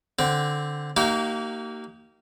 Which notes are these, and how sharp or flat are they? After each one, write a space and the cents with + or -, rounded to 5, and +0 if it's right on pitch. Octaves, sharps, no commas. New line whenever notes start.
D3 +0 C4 +0
A#3 -20 D#4 +0 G4 -45